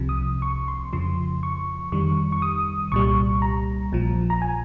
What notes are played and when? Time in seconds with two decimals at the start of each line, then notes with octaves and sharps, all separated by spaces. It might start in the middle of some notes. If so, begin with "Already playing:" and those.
Already playing: C2 C3 F3
0.09 D#6
0.42 C#6
0.68 C6
0.93 F2 C#3 F3 C6
1.43 C#6
1.92 F2 D#3 G3 C#6
2.32 C#6
2.42 D#6
2.92 C2 A#2 G3 C#6
3.42 A#5
3.92 A#1 A#2 F3
4.30 A#5
4.42 G#5